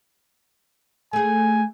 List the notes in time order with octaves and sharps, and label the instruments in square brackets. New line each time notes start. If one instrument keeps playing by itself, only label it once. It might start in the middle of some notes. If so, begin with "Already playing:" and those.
[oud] A3 G#4 [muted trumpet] G#5